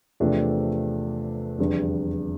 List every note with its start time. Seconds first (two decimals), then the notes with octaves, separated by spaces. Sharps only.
0.20 E2 C3 F3 A3 D4
1.59 F1 E2 D3 G3 D4